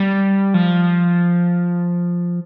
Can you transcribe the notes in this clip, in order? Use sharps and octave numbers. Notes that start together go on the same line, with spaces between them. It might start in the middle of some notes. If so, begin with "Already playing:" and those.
Already playing: G3
F3